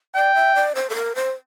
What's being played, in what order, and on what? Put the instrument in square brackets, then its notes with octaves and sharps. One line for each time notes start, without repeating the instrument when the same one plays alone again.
[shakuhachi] D5 [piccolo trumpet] G5
[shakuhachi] E5
D5
C5
A4
A#4
C5